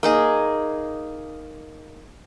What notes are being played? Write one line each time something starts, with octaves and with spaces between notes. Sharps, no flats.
A#3 D#4 G#4